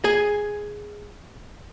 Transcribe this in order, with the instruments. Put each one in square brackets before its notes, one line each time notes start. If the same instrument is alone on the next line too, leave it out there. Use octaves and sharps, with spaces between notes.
[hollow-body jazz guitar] G#4 G#5